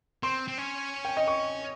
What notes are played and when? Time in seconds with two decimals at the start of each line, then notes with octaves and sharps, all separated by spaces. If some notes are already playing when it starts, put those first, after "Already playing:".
0.23 C4 C6
0.48 C4
0.58 C#4
1.05 G5
1.17 D#5
1.27 C#6